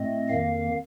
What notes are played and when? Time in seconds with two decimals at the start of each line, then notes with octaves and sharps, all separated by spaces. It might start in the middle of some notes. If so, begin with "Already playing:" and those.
Already playing: A2 A3 C4 D#5
0.29 F2 D#3 A#3 F5